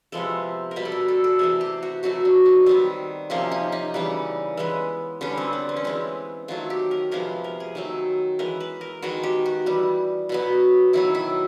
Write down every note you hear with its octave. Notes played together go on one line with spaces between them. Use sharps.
C3 F3 G#3 B3 A4
A#4
B2 G3 B3 B4
A4
A#4
A4
A4
C3 E3 A3 G#4
G4
F#4
B2 F#3 A3 F#4
D4
D#4
D#3 G3 B3 C4
C3 F3 A#3 C#4
D#4
D#4
C#3 E3 G3 B3
E3 G#3 B3
D3 G3 B3 C#4
C4
B3
C4
C#4
E3 G#3 B3 C4
D#3 F#3 A3 F4
G4
A#4
C3 F3 G#3 B3 A#4
A#4
G#4
D#3 F#3 A3
E3 G#3 B3 A#4
B4
A#4
D#3 G#3 B3 F#4
G4
F#4
E3 G3 B3
B2 F#3 B3
D#3 F#3 B3 E4
E4